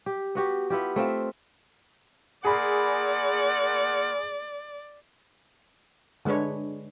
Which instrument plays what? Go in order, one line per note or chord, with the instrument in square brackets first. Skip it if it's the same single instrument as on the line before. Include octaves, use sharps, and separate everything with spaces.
[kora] G4
B3 F#4 G4
B3 E4 F4 G4
A3 C4 F4 E5
[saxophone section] A#2 A#4 F#5 [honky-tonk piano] G#4 B5 [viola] D5
[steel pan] D3 G#3 D4 B4 C#5